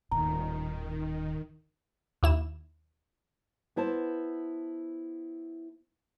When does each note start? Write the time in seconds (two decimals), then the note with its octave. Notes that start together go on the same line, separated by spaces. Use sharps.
0.11 D#1 A2 D#3 A#5
2.23 D#2 E4 E7
3.76 B3 E4 C5 A5